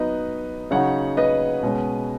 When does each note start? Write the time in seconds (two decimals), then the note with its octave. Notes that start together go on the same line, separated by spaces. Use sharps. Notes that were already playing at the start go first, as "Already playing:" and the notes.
Already playing: F#3 B3 D#4 B4 D#5
0.71 C#3 F#3 D#4 C#5 F#5
1.17 B4 D#5
1.63 B2 G#3 C#4